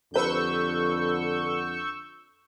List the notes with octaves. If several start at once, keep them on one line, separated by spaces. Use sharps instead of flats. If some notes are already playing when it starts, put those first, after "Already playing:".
F2 D3 G4 B4 C5 C#6 E6 G6